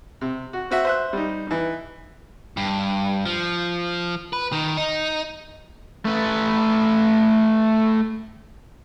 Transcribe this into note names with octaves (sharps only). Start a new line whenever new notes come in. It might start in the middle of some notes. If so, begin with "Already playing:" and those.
C3
F#4
C4 F#4 E5
C5 E5 F#6
G3 D#4
E3 D#4
G2
F3
B4
D#3
D#4
A3 B4